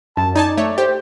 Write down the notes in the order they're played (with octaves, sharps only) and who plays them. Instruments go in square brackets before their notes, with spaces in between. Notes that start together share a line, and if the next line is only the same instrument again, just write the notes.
[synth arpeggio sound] F#2 [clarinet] A5
[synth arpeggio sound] D#4 G#5 A5 [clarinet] D5
[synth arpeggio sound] A3 C#5
[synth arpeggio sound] G4 [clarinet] C5